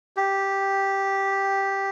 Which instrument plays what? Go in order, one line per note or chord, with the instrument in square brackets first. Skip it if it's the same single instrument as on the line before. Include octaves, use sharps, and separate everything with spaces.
[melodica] G4